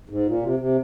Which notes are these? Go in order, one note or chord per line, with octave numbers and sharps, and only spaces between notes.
G#2
A#2
C3
C3